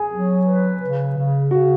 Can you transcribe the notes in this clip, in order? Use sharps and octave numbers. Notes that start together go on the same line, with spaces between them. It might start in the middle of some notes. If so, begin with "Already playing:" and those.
Already playing: G#4 G#5
F#3
B4
C#3
C#3
C#3 F#4